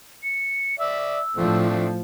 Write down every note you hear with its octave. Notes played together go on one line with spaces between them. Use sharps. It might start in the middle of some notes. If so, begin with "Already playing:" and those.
C#7
D5 E5 E6
A2 F3 A3 C4 D4